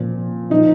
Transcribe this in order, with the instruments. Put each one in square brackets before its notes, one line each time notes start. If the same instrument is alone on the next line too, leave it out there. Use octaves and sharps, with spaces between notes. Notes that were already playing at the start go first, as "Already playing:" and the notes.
Already playing: [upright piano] A#2 F3
A#2 F3 D#4